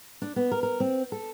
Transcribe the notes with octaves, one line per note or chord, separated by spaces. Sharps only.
D4
B3
A#4
A#4
C4
A4